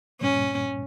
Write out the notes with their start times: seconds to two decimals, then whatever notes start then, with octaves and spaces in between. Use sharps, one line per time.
0.21 C#2 G2 A#2 C#4